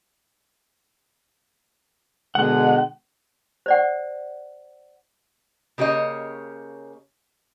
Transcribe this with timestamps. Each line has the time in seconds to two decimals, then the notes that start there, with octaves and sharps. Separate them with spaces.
2.35 B2 D3 G#3 F#5
3.66 C5 D5 F#5
5.78 C#3 A#3 G4 C#5 D#5